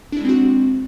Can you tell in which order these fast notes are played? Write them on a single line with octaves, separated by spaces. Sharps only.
D4 E4 G#3 C4 F#4